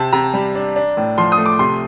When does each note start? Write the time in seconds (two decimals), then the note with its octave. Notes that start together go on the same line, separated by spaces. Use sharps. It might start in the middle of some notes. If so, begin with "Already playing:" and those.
Already playing: C3 C4 A5
0.13 C3 A#5
0.34 G3
0.55 D4
0.76 D4
0.97 A2
1.18 F3 C6
1.32 D#6
1.38 A3
1.46 D6
1.59 C3 C6